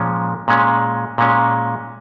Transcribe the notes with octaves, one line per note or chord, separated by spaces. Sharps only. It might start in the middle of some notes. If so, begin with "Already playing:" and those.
Already playing: A#2 F3 G#3 C#4
A#2 G#3 C#4
A#2 G#3 C#4